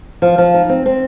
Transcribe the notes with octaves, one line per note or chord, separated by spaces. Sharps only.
F3
F3
D#4
C4
C4